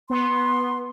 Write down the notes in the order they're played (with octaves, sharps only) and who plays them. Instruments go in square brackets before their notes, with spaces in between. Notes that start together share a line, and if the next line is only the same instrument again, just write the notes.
[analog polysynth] B3 [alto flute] C6